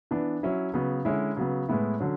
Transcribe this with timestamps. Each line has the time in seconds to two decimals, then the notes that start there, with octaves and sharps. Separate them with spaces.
0.11 E3 B3 D4
0.43 F#3 C#4 E4
0.74 C#3 F#3 B3
1.05 D3 G#3 C#4 E4
1.37 C#3 F#3 B3
1.69 A2 G#3 B3 E4
2.00 D3 F#3 C#4